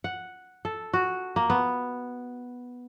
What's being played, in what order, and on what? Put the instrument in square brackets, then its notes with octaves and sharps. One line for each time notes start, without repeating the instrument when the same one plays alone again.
[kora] F#5
A4
F#4
A#3
B3